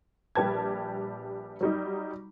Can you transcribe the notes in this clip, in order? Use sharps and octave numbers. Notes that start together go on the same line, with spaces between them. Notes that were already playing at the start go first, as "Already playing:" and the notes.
A#1 G3 G4 B4 A5 G#6
F#3 G3 D#4